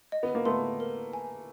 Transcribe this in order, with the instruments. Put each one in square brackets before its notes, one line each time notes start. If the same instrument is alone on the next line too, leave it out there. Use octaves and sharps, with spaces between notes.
[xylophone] D#5
[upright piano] B3
A#3
[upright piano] A3 B3 [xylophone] C6
[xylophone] A#4
G#5